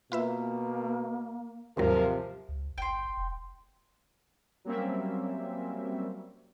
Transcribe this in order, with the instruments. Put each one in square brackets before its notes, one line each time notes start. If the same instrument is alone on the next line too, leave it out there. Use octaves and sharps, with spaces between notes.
[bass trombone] B2 [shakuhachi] A#3 [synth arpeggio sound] F4 B4 E5
[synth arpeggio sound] D#2 G#2 F#3 [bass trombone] C3 [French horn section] F3 A#4
[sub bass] C#2
[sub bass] G1 [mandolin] G5 C6
[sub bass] F1
[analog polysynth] F#3 G3 A#3 C4 C#4 E5